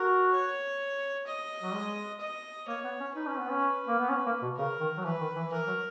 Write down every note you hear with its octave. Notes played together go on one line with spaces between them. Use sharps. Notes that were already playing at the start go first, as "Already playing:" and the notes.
Already playing: F#4 A#4
C#5
D#5
F#3
G#3
D#5
A#3 C#5
B3
C#4
D#4 B4
C#4
B3
C#4
A#3
B3
C#4
A#3
B2
C#3 A#4
D#3
F#3
E3 B4
D#3
E3
E3 A#4
F#3